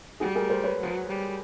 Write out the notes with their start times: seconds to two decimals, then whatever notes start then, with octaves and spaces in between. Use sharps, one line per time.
0.20 G3 F#4 G#4
0.35 G#4 A#4
0.50 A#4 C5
0.64 B4 C#5
0.79 F#3
1.08 G3